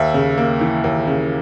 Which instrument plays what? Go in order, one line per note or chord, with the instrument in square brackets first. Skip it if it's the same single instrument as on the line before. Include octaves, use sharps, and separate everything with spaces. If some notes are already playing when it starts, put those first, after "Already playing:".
Already playing: [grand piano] D#2 E5
C#3
A#3
E3
D#2
C#3